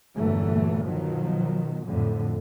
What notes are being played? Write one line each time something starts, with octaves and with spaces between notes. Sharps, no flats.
G1 E2 A#2 E3 F#3 A3
B2 D#3 F3 F#3
F2 A2 D3